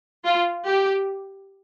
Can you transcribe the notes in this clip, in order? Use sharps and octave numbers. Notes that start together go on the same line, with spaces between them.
F4
G4